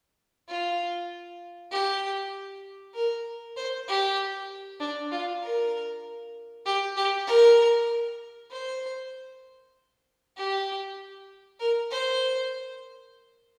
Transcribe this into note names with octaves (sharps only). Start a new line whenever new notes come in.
F4
G4
A#4
C5
G4
D4
F4
A#4
G4
G4
A#4
C5
G4
A#4
C5